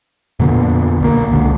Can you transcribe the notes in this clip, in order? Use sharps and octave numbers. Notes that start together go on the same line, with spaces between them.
F2 A#2 D3 B3
B1 D#3 A#3
C#2 D3